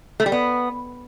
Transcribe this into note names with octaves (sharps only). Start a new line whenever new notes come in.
A3
G3
B3